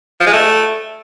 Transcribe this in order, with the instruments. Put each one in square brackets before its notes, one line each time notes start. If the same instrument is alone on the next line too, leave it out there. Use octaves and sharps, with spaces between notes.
[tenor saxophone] F3
G#3
A3